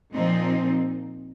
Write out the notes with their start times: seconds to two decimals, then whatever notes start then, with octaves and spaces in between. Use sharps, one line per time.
0.13 A#2 F3 C4 D#4